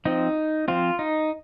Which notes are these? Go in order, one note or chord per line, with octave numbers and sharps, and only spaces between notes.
F3 C4 D#4
F3 C4 F4
D#4